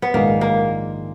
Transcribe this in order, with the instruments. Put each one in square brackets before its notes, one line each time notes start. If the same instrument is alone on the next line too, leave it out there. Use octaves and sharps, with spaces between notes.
[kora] B3
[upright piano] A#1 G#2 D#3 G#3 [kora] A#3
[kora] A#3